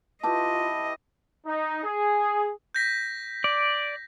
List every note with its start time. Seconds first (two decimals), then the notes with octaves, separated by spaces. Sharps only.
0.24 E4 F4 G4 B4 D#5 A5
1.46 D#4
1.84 G#4
2.75 G6 A#6 B6
3.44 D5